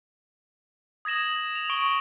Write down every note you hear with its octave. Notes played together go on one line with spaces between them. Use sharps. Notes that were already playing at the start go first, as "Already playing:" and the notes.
D#6 G#6 A#6 E7 F#7
F7
C#6 D7 G7